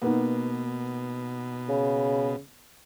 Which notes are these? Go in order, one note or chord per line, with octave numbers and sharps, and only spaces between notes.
B2 A#3 B3 D#4
C#3